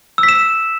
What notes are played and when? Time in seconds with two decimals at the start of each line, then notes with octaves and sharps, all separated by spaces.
0.18 E6
0.23 B6
0.29 E7